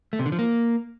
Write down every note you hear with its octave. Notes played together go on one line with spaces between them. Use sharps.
A3
C3
D3
F3
A#3